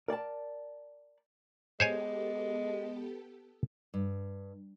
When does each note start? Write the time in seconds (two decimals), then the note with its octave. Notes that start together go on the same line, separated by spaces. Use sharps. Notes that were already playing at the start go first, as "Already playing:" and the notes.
0.08 A#4 D5 G5 A5
1.80 G#3 B3 G4 A4 C5 C#5 G#5
3.94 G2